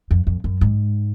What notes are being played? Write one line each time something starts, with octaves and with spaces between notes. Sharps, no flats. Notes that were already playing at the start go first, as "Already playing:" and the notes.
F2
F2
F#2
G#2